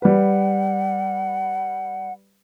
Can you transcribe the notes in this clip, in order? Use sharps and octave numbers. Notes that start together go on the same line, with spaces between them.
G3 B4 F#5